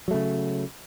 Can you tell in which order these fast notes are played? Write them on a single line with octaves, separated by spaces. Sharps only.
F#3 A3 C#3